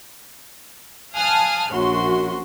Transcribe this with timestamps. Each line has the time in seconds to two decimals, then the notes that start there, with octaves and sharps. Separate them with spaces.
1.15 F5 G#5 A5 D#6 F6 F#6
1.71 A#1 F#2 F#4 C6